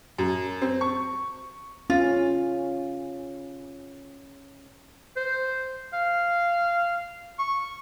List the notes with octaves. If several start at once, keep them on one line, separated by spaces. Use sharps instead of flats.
F#2
C4
C#6
C#4 F4
C5
F5
C#6